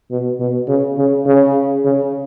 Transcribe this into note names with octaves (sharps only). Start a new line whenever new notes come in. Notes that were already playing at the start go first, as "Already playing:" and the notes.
B2
B2
C#3
C#3
C#3
C#3